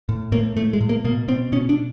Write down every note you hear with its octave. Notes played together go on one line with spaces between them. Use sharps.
A2
A2 A#3
A2 A3
G#3
A2
A#3
B2 A#3
B2 C4
B2 C#4
D4